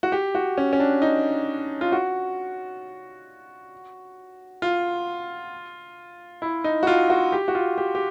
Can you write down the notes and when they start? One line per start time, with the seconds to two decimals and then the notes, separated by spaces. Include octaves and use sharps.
0.03 F#4
0.12 G4
0.35 F#4
0.58 C#4
0.73 C#4
0.80 D4
1.02 D#4
1.81 F4
1.92 F#4
4.62 F4
6.42 E4
6.64 D#4
6.83 F#4
6.87 F4
7.10 F#4
7.32 G4
7.48 F#4
7.55 F4
7.78 G4
7.95 G4